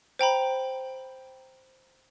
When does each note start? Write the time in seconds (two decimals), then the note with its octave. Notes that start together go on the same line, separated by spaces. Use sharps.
0.19 C5 G5 A#5 B5